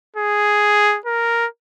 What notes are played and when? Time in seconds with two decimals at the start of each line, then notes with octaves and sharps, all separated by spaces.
0.17 G#4
1.06 A#4